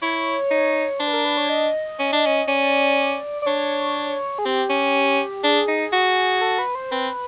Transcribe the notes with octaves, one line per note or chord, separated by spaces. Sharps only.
E4 C#5
D#4
D4 C5
B4
A#4
B4
C#5
D#5
C#4
D4
C#4
C#4 D5
D5
D4 C#5
G#4
C4 G4
C#4
D4 G#4
D#4
F#4
A4
B4
C5
C4 B4